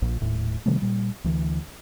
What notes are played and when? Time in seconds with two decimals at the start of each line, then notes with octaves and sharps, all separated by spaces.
0.02 A#1 A#2
0.21 D#1 A2
0.66 C3 D#3 G3 A3
0.82 A#2 G3
1.24 D2 E3